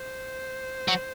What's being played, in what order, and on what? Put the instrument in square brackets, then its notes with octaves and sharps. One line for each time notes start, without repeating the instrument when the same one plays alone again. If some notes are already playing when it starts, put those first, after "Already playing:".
Already playing: [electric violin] C5
[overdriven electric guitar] F#3